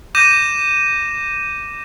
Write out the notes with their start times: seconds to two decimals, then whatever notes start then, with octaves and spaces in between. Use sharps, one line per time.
0.15 D6 G6 A#6 D#7 E7